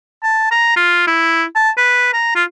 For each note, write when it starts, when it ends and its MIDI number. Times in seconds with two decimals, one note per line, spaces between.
0.23 0.50 81
0.51 0.76 82
0.76 1.04 65
1.07 1.44 64
1.55 1.70 81
1.77 2.11 71
2.13 2.30 82
2.35 2.44 65